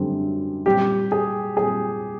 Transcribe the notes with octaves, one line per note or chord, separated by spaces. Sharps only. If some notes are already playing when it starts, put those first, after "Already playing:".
Already playing: F#2 D3 G3 C4
A#2 G3 C4 G4
G#4
A#2 G3 C4 G#4